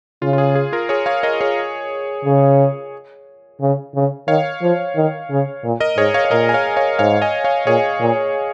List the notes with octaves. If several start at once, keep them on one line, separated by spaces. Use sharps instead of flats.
C#3 F4
F4
G#4
G#4
F4 A#4
G#4 C#5
C#5 F5
A#4 D#5
G#4 C#5
C#3
C#3
C#3
D#3 C#5 F5
F3
D#3
C#3
A#2
A#4 D#5
G#2 G#4 C#5
C#5 F5
C#5
A#2 A#4 D#5
G#5
C#5 F5
C#5 F5
G#2 C#5 F5
D#5 G#5
C#5 F5
A#2 G#4 C#5
A#2